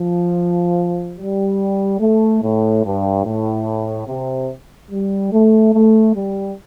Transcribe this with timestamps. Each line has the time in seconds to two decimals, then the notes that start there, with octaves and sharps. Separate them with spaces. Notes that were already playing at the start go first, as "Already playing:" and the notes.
Already playing: F3
1.17 G3
2.00 A3
2.42 A2
2.84 G2
3.25 A2
4.08 C3
4.91 G3
5.32 A3
5.74 A3
6.15 G3